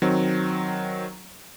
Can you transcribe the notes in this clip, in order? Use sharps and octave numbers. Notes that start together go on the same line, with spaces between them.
D#3 F#3 C4